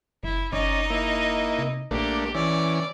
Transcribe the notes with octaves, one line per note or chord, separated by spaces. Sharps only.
F#1 E4
F#1 C#4 D#4 D5 D#5
A#3 E4
C3
A#1 A3 A#3 D4 G4
E3 C#4 D5